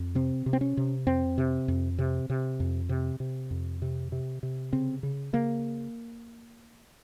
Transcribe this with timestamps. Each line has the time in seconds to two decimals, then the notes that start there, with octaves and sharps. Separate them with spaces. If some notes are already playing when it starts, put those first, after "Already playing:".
Already playing: F2
0.15 C3 C4
0.46 C3
0.53 C4
0.61 C#4
0.77 C3
1.07 F2 C4
1.38 C3
1.68 F2
1.99 C3
2.30 C3
2.60 F2
2.89 C3
3.20 C3
3.51 F2
3.82 C3
4.12 C3
4.43 C3
4.73 C#3 C4
5.03 C#3
5.33 C#3 A#3